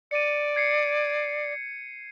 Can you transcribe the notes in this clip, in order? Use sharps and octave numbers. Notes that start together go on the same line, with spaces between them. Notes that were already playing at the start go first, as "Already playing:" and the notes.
D5 C#7 D#7
G#6 C7 C#7